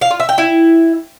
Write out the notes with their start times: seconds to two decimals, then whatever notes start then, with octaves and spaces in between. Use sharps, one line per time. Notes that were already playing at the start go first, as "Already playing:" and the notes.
0.01 F5
0.10 F4
0.20 E5
0.29 G5
0.38 E4